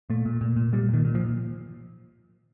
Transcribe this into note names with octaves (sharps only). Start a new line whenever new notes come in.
A#2 A3
A#2
A#2
A#2
A#2 G3
A#2 D#3
A#2
F3
A#2